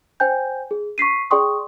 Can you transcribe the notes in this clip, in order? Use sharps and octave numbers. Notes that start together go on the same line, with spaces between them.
C5 G5 G#5 G6
G#4
C#6 B6 C7 D#7
G#4 D5 G5 C6 C#6 D#6